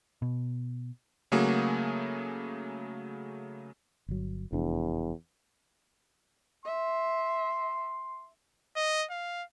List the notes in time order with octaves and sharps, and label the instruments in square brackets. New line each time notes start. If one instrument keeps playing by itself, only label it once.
[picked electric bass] B2
[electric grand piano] C#3 F#3 A3 A#3 F#4 G#4
[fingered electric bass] G1 F#3
[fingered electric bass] F1 D4 [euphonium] E2
[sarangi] E5 [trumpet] C6
[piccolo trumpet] D#5
F5